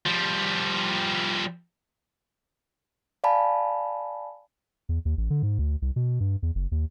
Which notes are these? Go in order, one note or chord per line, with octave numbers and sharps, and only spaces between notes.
F3 G3
D5 F5 G#5 A5 B5
E2
D#2
A1
D3
G#2
D2
C2
B2
G2
E2
F#1
D#2